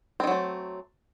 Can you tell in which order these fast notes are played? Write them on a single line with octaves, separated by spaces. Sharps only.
C4 D#3 F#3 A3